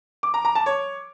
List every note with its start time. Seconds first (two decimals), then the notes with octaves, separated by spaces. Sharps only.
0.23 D6
0.34 A#5
0.45 A#5
0.55 A5
0.66 C#5